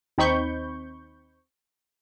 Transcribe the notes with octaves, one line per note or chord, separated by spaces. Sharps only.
D#2 C4 D#4 B5 C#6 G6